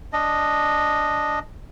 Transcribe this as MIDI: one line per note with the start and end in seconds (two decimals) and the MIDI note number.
0.13 1.39 62
0.13 1.39 75